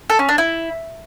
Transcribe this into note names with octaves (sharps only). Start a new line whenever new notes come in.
A4
C#4
D4
E4